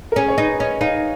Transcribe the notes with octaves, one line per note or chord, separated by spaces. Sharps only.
A#4
C#4 G#4
C#5
D#4 B4
C#4 D#5
D#4 F5